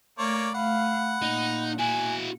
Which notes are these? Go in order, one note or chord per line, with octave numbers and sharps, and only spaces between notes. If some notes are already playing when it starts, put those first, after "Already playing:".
A3 A#3 C#5 D5
A3 F5 F#5 B5
A#2 D#4
E4 F#4 G#5